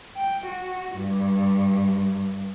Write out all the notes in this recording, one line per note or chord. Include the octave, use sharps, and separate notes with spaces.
G5
F#4
G2